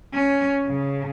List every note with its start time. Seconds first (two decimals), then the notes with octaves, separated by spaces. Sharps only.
0.14 C#4
0.66 C#3